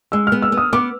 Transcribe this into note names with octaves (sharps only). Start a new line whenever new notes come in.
G#3 E6
F6
B3
E6
B3
D#6
B3 D6